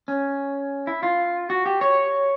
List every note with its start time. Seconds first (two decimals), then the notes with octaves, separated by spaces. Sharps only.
0.08 C#4
0.87 E4
1.03 F4
1.50 F#4
1.66 G4
1.81 C#5